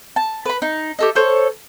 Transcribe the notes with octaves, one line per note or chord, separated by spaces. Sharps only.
A5
B4 B5
D#4
G4 A4 D#5
A4 C5 C#5